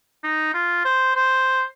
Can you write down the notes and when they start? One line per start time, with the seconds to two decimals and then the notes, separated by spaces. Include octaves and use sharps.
0.24 D#4
0.54 F4
0.85 C5
1.16 C5